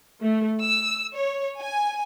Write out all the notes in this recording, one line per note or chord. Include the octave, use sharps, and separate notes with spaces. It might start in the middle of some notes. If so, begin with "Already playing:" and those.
A3
E6
C#5
G#5